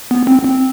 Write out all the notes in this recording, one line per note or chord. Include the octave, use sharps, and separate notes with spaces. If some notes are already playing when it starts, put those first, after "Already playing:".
B3
C4
C4